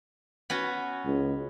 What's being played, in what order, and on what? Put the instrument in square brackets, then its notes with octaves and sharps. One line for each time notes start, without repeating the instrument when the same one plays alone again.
[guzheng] B3 C#4 F#4
[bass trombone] C#2